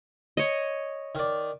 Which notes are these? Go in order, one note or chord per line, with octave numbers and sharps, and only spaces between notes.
C#5 D#5
D#3 D5